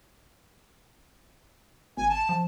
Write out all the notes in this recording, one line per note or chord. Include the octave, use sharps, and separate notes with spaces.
G#1 G#5
A5
F3